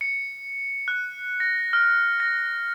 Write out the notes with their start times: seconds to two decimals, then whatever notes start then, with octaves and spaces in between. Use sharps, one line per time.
0.01 C#7
0.88 F#6
1.40 A#6
1.73 F6
2.20 A#6